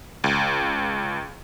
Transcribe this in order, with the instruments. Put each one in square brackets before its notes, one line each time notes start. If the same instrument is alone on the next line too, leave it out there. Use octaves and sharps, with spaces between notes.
[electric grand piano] C#2